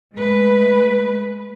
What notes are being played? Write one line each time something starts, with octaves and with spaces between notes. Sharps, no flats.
G#3 A3 B4